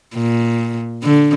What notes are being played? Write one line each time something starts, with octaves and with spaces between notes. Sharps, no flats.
A#2
D3